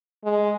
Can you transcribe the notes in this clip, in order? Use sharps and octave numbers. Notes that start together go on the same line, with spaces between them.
G#3